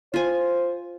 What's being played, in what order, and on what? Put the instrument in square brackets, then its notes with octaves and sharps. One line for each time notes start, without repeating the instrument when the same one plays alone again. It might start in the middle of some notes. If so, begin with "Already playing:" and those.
[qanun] F4 G#5 [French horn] C5